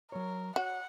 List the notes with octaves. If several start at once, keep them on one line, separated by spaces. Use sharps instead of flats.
F#3 A#4 C#5
F#4 C#5 F#5